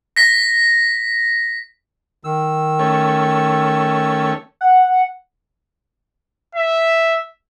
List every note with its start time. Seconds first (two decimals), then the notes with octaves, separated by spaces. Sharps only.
0.16 A#6 B6
2.24 D#3 E6
2.79 A3 C#4
4.61 F#5
6.55 E5